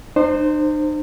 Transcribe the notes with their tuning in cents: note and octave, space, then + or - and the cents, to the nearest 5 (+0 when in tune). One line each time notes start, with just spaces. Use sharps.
D#4 -45 C5 +0